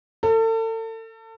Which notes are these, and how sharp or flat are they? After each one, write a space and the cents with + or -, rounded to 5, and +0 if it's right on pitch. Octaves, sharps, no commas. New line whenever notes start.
A4 +35